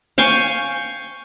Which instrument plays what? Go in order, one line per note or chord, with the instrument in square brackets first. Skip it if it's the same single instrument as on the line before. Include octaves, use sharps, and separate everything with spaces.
[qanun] F5 G5 G#5 C#6